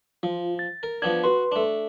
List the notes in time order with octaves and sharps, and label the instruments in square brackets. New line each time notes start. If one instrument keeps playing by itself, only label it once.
[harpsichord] F3 [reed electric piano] F4
[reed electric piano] A6
[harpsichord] A#4
[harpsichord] F3 B3 D4 [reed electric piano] G#6
[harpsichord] F#4 [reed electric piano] B4 C6
[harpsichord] A3 D4